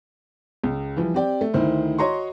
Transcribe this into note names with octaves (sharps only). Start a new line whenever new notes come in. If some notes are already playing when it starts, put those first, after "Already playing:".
C#2
E3 F3 G3
C4 G4 D5 G5
A3
D2 D#3 E4 C5
F#4 C#5 D#5 A#5 C6 C#6